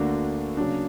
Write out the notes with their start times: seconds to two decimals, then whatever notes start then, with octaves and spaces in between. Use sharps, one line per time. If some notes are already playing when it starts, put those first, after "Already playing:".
Already playing: D2 D3 A#3 D4 F#4
0.57 C#3 F#3 A#3 D4